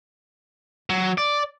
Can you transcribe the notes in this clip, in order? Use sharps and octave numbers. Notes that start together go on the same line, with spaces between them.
F#3
D5